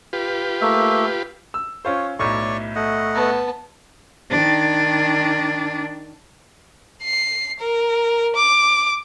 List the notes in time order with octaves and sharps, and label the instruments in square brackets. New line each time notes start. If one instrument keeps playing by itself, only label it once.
[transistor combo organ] F4 G4 B4
[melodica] A3 A#3 E5
[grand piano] E6
[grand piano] C#4 F4 C5 [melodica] C#5
[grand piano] B1 A2 [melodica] C#5 D5 C#6
[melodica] A3 D#5 F#5
[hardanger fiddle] B3 A5
[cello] D#3 D4
[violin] C7
A#4
D6